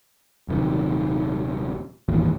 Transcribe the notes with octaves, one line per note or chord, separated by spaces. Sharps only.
D#1 F#2 C3 D#3
D#1 G#1 E2 A#2